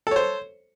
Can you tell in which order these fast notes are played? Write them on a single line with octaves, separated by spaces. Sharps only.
A4 C#5 C5